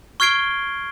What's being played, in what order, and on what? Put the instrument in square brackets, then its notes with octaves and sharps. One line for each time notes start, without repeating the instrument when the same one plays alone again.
[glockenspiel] C#6 F6 G#6 C7 D7 G7